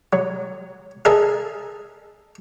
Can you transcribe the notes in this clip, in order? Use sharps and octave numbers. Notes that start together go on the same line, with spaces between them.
F#3
G#4 A#4 D#5 E5 G#5 A5